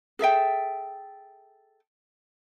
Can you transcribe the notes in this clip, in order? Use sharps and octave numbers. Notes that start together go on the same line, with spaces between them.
G#4 A4 E5 G5